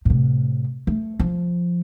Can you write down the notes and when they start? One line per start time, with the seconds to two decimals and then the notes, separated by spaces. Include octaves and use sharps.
0.05 A2 C3
0.87 A3
1.19 F3